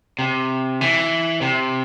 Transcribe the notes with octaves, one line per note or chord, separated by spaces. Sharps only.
C3
E3
C3